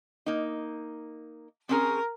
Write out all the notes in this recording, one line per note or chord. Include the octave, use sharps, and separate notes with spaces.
A#3 D#4
C4 C#4 G#4 A#4